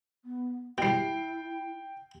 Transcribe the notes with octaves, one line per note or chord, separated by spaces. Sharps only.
B3
B2 G3 E4 G5 C7